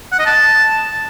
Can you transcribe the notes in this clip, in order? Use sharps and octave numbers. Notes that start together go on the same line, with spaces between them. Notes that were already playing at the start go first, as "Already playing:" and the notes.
F#5
D#5
A5